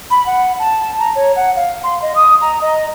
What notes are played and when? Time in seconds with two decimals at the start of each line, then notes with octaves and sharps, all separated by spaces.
0.10 B5
0.26 F#5
0.59 A5
0.99 A#5
1.16 C#5
1.36 F#5
1.56 F5
1.84 C6
2.02 D#5
2.15 D#6
2.41 A#5
2.61 D#5